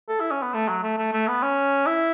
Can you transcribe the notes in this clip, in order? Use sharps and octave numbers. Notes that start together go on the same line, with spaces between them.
A4
E4
C#4
B3
A3
F#3
A3
A3
A3
B3
C#4
E4